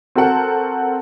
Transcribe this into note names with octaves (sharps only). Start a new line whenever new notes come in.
C4 F#4 A4 A#4 F#5